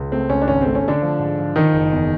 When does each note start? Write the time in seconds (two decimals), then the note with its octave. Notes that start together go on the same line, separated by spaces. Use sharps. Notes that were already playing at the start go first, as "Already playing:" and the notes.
Already playing: C#2
0.12 A3 C4
0.30 C#2 C#4
0.42 D4
0.48 G#1 C#4
0.61 A3 C4
0.75 C#4
0.84 D3 A3 D4
1.02 F3
1.19 G#2
1.38 F3
1.55 D#3 F3 D#4
1.73 F#1
1.92 E2